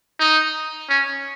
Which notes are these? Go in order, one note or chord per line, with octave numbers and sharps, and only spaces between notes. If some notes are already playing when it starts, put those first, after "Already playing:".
D#4
C#4